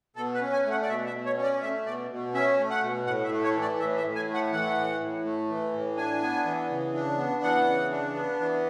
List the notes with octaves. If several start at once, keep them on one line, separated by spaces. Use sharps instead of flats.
B2 A4
B4
C#4
G#5
A3 F#5
D5
B2 E5
E5
B2
C#5
C#4
D5
A3 E5
B2 D5
B2
C#4 E5
A3
F#5
B2
A2 F#5
E5
A3
C#5
E3
D5
A2 E5
E5
A2
G#5
A3
F#5
E3 F#5
A2
A2
A3
E3
A2
D4 G#5
B3
E3
C#3
D4
B3
E3 F#5
C#3
D4
B3
E3